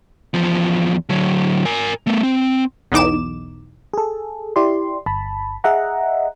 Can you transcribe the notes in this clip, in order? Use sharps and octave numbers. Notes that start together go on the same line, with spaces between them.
E2 F3
D3 F#3
A#4 G#5
A3 B3
C4
B1 E2 D#4 D6 E7
G#4 A4
E4 G4 D5 C6
G1 A5 B5
G#4 D#5 E5 F#5 A#5